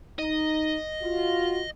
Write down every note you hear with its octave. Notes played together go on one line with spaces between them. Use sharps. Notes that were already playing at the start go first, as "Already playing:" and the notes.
D#4 D#5
F4 F#4